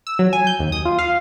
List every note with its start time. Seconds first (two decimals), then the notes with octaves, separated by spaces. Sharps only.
0.07 E6
0.19 F#3
0.33 G#5
0.47 G6
0.59 D#2
0.72 D#6
0.85 F4
0.99 F5